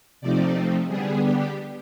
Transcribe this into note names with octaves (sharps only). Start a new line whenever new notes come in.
C3 F3 A3 C4 D#4 D5
D3 G3 B3 D4 G#4
G4